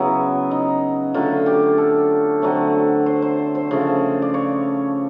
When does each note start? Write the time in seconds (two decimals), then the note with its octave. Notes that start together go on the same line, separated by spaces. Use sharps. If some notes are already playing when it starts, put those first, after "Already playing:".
Already playing: C#3 F#3 B3 E4
0.51 D#4
1.14 D3 F#3 A3 F4
1.46 G4
1.78 A4
2.42 D3 F#3 A3 C4
3.06 C5
3.22 C5
3.55 C5
3.71 C#3 F3 A3
4.22 D5
4.34 C#5